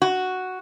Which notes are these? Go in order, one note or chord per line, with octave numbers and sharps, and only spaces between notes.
F#4